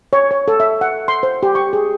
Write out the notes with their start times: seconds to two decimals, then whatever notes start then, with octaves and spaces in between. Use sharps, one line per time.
0.13 C#5
0.31 C#5
0.48 A4
0.60 E5
0.81 F#5
1.08 C6
1.23 C5
1.43 G4
1.55 C#6
1.73 G#4